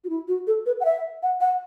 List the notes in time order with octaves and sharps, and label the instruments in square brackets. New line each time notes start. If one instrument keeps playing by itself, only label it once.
[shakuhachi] F#4
E4
F#4
A4
B4
F#5
E5
F#5
F#5